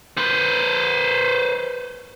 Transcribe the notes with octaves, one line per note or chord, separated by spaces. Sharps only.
B4 C5